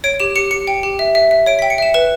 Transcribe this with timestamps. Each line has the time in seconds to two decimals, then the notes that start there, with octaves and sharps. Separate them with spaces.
0.04 C#5 D7
0.20 G4 E7
0.36 G4 C#7
0.51 G4 C#7
0.67 G5
0.83 G4
0.99 E5
1.15 E5
1.31 E5
1.46 C#5 D7
1.59 G5 B6
1.70 C#7
1.78 E5 E7
1.94 B4 E7